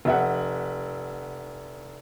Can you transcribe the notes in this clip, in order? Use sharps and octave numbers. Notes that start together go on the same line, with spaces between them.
F1 E5 F#5